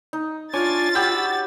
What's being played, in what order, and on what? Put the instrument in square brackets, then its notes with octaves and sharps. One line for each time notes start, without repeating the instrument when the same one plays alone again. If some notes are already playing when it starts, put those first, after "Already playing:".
[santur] D#4
[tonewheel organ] D4 G#5 [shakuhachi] F4 [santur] C#5 [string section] A6
[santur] F#4 G4 G5 [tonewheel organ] B5 E6